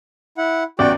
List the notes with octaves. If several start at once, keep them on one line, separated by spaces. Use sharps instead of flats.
E4 F#5
A1 E2 F#4 D5 G5